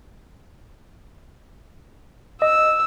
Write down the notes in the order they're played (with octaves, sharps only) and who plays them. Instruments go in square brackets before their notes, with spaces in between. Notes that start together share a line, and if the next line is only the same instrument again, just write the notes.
[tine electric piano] D#5 [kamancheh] E6